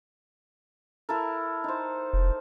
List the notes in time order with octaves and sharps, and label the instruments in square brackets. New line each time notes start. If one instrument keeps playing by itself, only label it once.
[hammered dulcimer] E4 A4 A#4
D#4 C5
[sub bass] F1